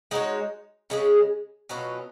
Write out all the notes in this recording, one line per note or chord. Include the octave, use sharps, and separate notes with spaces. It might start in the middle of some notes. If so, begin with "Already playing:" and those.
G#3 D#4 F#4 C#5
C#3 G#3 C#4 G#4
B2 F#3 C#4 F4